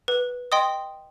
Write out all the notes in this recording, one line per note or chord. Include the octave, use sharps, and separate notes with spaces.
B4
D#5 G5 C6 D#6